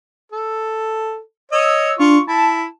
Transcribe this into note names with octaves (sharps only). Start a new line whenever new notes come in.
A4
C#5 D#5 E6
D4 F4 C#6
E4 A5